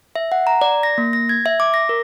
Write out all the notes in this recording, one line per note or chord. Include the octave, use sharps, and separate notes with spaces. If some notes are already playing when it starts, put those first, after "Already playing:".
E5
F#5
A#5
D5
A#6
A#3
A#6
G#6
E5
D6
A#6
A#4